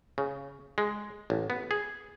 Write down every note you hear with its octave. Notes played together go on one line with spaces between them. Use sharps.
C#3
G#3
A1
B3
G#4